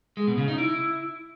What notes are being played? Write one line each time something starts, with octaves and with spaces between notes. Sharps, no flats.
G#3
B2
C#3
D#4
E4